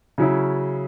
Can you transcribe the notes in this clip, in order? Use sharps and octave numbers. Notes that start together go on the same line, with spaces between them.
C#3 F#3 C#4 E4